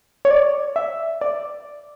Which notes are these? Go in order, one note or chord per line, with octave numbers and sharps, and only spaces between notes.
C#5
D5
E5
D5